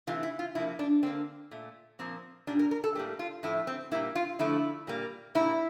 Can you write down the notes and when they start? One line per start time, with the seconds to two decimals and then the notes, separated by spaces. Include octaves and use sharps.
0.07 C3 E3 A3 F4
0.23 E4
0.39 F4
0.55 C3 F3 A#3 E4
0.79 D4
1.03 D3 G3 A#3 C4
1.51 A#2 A3
1.99 A#2 F3 A#3 C4
2.47 A#2 G3 A#3 D4
2.59 A#4
2.71 A#4
2.84 A4
2.95 A2 G3 A#3 G4
3.19 F4
3.43 A2 F3 A3 E4
3.67 C4
3.91 A#2 G3 A#3 E4
4.15 F4
4.39 D3 F3 A3 E4
4.87 A#2 G3 A#3
5.35 A#2 G3 A#3 E4